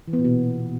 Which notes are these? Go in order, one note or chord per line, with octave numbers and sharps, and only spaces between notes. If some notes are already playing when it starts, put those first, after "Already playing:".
E3
B3
A#2
B2